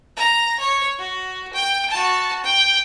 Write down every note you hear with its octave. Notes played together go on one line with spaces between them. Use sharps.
A#5
C#5
F#4
G5
F#4 A5
G5